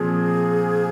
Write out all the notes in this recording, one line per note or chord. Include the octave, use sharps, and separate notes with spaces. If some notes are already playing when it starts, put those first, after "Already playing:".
Already playing: A#2 F3 C4 G#4